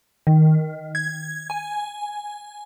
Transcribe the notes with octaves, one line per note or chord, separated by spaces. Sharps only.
D#3
G#6
G#5